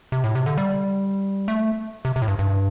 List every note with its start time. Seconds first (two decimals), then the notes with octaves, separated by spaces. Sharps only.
0.12 C3
0.24 A2
0.35 C3
0.46 D3
0.58 G3
1.48 A3
2.05 C3
2.16 C3
2.22 A2
2.28 G2
2.39 G2